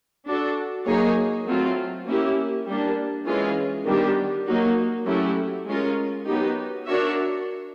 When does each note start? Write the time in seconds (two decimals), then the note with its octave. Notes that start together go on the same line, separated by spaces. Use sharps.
0.26 D4 F#4 A4
0.86 F#3 A#3 D#4 G#4 C#5
1.46 F#3 A3 C4 F4
2.06 A#3 C#4 E4 G4
2.66 G3 A#3 D4
3.26 E3 G#3 C#4 F4 G#4
3.86 D#3 G3 B3 D4 G4
4.46 F#3 A#3 D#4 F#4
5.06 F#3 A3 C#4 E4 G4
5.66 G#3 C#4 F4 A#4
6.26 F#3 B3 D#4 G4
6.86 D4 F#4 A#4 C#5 E5